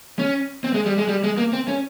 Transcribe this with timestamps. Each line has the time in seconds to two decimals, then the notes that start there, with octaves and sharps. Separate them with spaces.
0.19 C#4
0.64 C4
0.74 G#3
0.86 G3
0.98 G#3
1.08 G3
1.24 G#3
1.37 A#3
1.53 C4
1.68 C#4